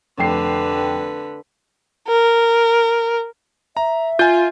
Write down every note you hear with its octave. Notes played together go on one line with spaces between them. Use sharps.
F1 D3 B4 G5 C7
A#4
E5 A#5
F4 G#5 G6